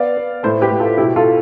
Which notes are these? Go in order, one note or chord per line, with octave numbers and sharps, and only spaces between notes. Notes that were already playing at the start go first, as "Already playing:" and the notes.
Already playing: B3 D5 F5
B3
A2 A4 C5
G4 B4
A2
F4 A4
B2 E4 G4
F4 A4